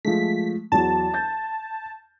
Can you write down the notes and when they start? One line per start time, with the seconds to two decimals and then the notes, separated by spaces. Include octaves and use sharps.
0.05 F3 G#3 A3 B6
0.72 E2 F#3 A5
1.14 G6 A6